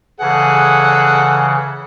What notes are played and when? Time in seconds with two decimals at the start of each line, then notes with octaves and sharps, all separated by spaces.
0.21 C#3 E3 G#4 A4 F#5